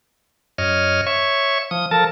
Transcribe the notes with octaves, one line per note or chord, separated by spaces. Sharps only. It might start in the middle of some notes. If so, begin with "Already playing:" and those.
F#2 C#5 D#5 F6
C#5 E5 C#6
F3 D#6
F3 A4 A#4 A5